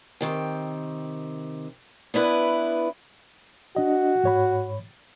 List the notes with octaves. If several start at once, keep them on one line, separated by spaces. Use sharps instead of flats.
C3 D#3 G5
B3 D4 E4 B4
D4 F#4 D#5
G#2 C#5 B5